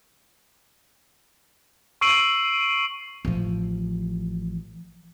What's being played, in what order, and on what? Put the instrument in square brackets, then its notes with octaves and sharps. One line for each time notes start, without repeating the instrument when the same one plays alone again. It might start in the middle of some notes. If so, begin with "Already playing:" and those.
[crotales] C#6 E6 C7 D7 D#7 F#7
[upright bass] A1 F3